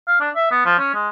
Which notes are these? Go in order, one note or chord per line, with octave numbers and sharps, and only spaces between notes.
F5
D4
E5
B3
F3
C#4
G#3